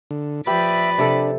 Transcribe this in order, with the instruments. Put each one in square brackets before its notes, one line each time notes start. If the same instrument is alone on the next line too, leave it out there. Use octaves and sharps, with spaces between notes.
[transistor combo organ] D3
[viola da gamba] F3 B4 D5 [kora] G4 [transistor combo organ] E5 [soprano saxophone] B5
[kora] C3 A4 [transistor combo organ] D4